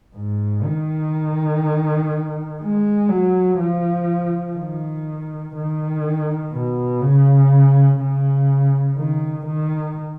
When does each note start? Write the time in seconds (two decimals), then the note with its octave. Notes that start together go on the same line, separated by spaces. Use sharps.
0.15 G#2
0.64 D#3
2.61 G#3
3.09 F#3
3.59 F3
4.57 D#3
5.55 D#3
6.53 B2
7.01 C#3
8.00 C#3
8.97 D#3
9.47 D#3